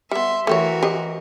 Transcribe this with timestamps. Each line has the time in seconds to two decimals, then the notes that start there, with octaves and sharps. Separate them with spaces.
0.11 G3 B3 E5 C6
0.47 E3 A3 F#4 G4 A#4 C#5
0.83 G4 C5 D#5